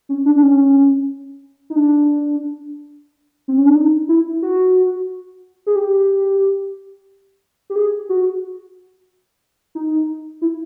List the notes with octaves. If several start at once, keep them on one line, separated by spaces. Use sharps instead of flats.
C#4
D4
D4
C#4
D#4
D4
C4
C#4
D4
D#4
E4
F#4
G#4
G4
G4
G#4
F#4
D#4
E4